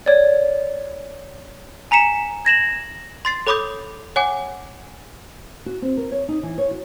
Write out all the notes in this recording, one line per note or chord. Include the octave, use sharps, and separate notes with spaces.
C#5 D5
G#5 A#5 B6 C#7 E7
G#6 A#6 E7 F#7
C6 A6 C7
A4 C#5 B5 D6 D#6 G6
C#5 F#5 G#5 D6
F#4
C4
A#4
C#5
D#4
E3
C#5
F#4